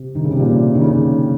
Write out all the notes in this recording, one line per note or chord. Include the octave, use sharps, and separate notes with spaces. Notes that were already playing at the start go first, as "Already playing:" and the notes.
Already playing: C3
D#3
C#3
C3
A#2
D#3
C#3